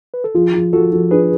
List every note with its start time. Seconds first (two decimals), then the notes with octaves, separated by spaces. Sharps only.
0.14 B4
0.24 A4
0.34 F3 F4 G#4
0.54 F3
0.73 F3 F#4 A4
0.92 F3
1.11 D4 G#4 B4